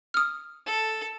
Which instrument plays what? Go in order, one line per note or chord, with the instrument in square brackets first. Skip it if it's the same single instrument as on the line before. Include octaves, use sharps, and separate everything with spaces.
[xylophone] D#6 F6
[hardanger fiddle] A4